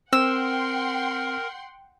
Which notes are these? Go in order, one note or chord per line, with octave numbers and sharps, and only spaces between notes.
C4 A#4 F#5 G5 C6 E6